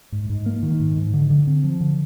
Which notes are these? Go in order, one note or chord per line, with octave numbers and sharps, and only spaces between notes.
G#2
G#2
A#3
D#3
G#2
G#2
D3
D3
C4
F3
D3